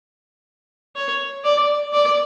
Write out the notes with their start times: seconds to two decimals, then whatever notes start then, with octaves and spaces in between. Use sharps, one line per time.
0.96 C#5
1.44 D5
1.93 D5